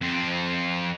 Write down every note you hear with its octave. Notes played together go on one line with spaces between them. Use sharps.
F2 C4